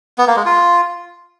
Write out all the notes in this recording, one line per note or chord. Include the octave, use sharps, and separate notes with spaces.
B3
A#3
G#3
F4